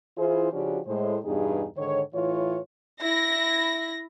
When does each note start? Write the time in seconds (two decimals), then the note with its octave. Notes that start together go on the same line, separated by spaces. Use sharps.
0.17 E3 E4 F4 G#4 C5
0.51 C#3 F3 C#4 D4 F#4 G4
0.86 A2 G#3 C5
1.24 E2 G2 B2 D#4 G4 G#4
1.76 G#2 D3 D#3 C#5
2.14 A2 E3 F4 C#5
3.01 E4 A#6